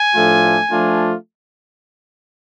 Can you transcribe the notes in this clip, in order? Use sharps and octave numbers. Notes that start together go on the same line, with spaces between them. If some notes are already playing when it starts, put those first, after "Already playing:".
Already playing: G#5
A2 F3 A3 D4 F4
F3 A3 D4 F4